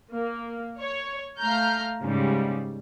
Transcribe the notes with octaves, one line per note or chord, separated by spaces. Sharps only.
A#3
C#5
A3 F5 A#5 F6 G6
G#2 C#3 G3